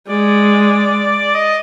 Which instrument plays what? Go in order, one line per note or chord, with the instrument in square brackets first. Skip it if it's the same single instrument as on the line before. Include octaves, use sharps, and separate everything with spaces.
[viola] G#3 [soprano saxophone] D5
[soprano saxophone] D#5